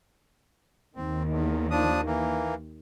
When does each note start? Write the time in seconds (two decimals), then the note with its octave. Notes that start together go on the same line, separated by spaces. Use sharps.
0.96 D#2 D#3 C4
1.28 E2
1.71 F3 D4 D#6
2.06 E3 A#3